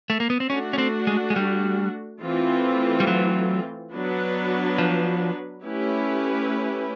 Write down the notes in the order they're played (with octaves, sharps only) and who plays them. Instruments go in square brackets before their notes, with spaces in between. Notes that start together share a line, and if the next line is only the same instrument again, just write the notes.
[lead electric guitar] A3
A#3
B3
C4
[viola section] A3 D4 F#4 [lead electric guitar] C#4
[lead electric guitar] C#4
C4
G#3
G#3
G3
[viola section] E3 A3 C4 F4
[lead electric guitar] G3
F#3
[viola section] F#3 B3 D4 F#4 B4
[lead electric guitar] F3
[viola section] A3 C#4 E4 G4 B4